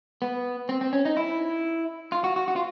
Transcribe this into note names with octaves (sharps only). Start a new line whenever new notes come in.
B3
C4
C4
C#4
D#4
E4
F4
F#4
F#4
F#4
F4